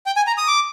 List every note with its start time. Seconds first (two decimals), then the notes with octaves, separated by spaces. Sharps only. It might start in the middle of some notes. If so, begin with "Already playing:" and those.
0.06 G5
0.16 G#5
0.27 A#5
0.38 D#6
0.48 D6